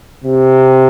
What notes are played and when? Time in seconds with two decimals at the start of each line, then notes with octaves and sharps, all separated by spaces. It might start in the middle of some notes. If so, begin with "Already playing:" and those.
0.24 C3